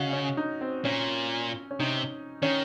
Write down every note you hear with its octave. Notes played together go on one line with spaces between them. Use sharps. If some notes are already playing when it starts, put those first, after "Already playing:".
Already playing: C#3 F#4 D#5
C#4
D#4
C4
A#2 C#4
C#4
C3 D#4
D#3 C#4